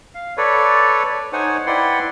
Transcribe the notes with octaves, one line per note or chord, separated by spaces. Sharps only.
F5
A4 B4 C#5 D5
D#4 C5 C#5 F#5 G#5
E4 B4 D5 F#5 G5 C6